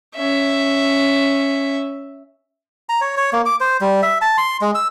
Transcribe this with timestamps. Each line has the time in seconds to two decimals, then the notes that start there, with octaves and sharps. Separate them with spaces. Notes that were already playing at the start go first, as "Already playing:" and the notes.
0.16 C#4 E5
2.89 A#5
3.01 C#5
3.17 C#5
3.33 A#3
3.46 D6
3.60 C5
3.81 G3
4.02 E5
4.21 A5
4.38 C6
4.61 G#3
4.75 E6